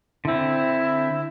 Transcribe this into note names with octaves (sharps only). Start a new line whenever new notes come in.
D3 C4 E4